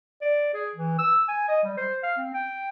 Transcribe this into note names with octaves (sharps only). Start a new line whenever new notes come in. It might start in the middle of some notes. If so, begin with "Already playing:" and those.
D5
G#4
E3
E6
G#5
D#5
G3
C5
F5
C4
G5